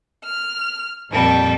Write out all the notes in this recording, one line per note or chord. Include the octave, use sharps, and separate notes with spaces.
F6
F2 A#2 G3 A4